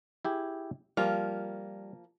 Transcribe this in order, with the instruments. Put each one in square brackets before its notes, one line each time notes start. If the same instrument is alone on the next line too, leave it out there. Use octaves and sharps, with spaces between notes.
[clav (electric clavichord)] E4 G4 G#4
[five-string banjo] F3 A#3 F4 [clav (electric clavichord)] G3